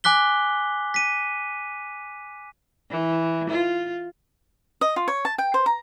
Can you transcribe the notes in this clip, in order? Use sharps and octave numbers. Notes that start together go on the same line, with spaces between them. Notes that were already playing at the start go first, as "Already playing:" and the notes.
G#5 D6 F#6 B6 G7
B6 D#7
E3
F4
D#5
F4
C#5
A5
G5
C5
A#5